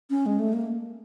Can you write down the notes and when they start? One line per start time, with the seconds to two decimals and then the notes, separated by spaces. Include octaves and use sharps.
0.10 C#4
0.26 G#3
0.39 A3
0.53 A#3